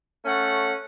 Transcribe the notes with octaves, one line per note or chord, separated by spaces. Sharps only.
A3 C#4 F#5